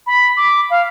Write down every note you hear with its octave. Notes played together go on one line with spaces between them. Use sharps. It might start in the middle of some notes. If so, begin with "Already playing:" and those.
B5
D6
F5